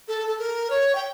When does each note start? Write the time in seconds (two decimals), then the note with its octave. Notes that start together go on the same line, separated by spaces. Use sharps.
0.08 A4
0.27 A4
0.39 A#4
0.70 C#5
0.95 G5